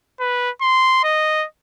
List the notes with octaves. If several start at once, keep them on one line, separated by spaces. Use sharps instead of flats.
B4
C6
D#5